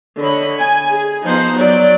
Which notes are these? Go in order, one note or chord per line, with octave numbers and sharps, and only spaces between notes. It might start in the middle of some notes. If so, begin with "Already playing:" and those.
D3 C#5 D#5 B5
G#5
G#4
F3 B3 D#4 C5
F#3 D5